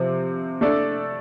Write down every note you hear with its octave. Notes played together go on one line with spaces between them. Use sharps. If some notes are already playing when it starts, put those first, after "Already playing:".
Already playing: C3 F3 C4
A3 D4 A4 D5